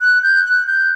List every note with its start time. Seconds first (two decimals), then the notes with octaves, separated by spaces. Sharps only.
0.01 F#6
0.23 G6
0.45 F#6
0.67 G6